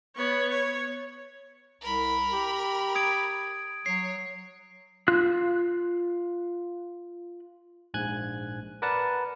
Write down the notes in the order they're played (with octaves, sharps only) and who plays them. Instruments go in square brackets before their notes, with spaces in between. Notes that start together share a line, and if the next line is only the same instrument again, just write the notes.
[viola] B3 C#5
C#5
[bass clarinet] C2 [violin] A#4 B5
[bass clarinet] G4
[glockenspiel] D#6 G#6 D7
[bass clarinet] F#3 [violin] C#5 [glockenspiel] C7
[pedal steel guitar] F4 F#6
[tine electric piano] A#1 G#2 G#5 F#6 G#6
A#4 B4 D5 F#5 A5